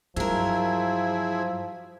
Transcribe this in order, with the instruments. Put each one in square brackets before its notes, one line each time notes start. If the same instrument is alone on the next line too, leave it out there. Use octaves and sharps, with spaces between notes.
[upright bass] G2 [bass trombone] F3 [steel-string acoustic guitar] F#3 A#4 [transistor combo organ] E4 G#4